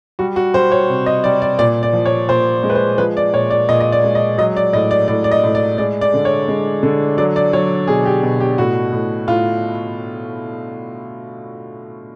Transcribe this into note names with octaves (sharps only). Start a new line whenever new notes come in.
G3 F#4
F#4
G3 C5
C#5
C3
D#5
G3 D5
D5
A#2 D5
D5
F3
C#5
A#2 C5
G#3
B4
C5
F3 B4
D5
A#2 C#5
D5
A#2 D#5
D#5
D5
G#3
D#5
F#3 D#5
D5
A2 D#5
D5
A2 D5
D5
D#5
A2
D5
G#3 D5
D5
D3
C#5
G#3
D3
F#3 D5
D5
F#3 C#5
B2 G#4
G4
B2
G4
A2 F#4
A2
A2 F4